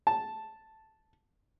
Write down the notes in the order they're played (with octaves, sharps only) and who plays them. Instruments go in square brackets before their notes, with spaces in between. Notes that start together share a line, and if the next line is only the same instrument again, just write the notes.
[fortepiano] A5